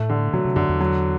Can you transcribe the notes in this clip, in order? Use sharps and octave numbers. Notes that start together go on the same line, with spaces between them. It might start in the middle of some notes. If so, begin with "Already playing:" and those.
Already playing: A2 A3
D3
B2 F#3
C3
F#2 D3
E2
F#3